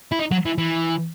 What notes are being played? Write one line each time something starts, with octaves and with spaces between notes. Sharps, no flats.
E4
D#4
F#3
E3
E3